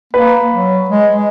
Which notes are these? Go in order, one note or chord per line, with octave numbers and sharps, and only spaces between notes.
A#3 B4
F#3
G#3
G#3